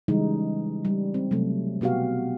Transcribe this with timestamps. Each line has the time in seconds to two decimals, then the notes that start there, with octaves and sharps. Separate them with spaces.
0.08 C#3 E3 G3 G#3 D#4
0.85 G3
1.14 C4
1.31 C3 F#3 A3
1.81 B2 B3 F#4 G4 F5